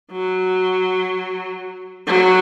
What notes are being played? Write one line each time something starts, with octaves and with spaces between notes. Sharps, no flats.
F#3
F#3